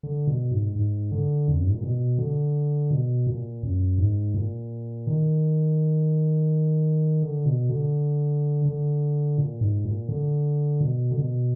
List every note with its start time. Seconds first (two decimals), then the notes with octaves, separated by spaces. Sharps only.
0.03 D3
0.27 B2
0.51 G#2
0.76 G#2
1.11 D3
1.48 F2
1.57 F#2
1.66 G#2
1.74 A#2
1.83 B2
2.19 D3
2.91 B2
3.27 A#2
3.63 F#2
3.98 G#2
4.34 A#2
5.07 D#3
7.22 D3
7.45 B2
7.69 D3
8.65 D3
9.38 A#2
9.61 G#2
9.85 A#2
10.09 D3
10.81 B2
11.11 D3
11.17 B2